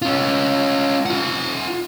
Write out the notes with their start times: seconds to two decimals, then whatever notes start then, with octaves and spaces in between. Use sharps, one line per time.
0.02 C#4 F4
1.06 F4 F#5